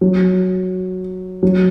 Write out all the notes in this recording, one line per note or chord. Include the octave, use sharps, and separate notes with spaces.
F#3
F#3